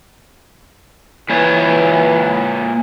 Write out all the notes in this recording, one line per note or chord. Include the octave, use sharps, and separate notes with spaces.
A#2 E3 B4 C#5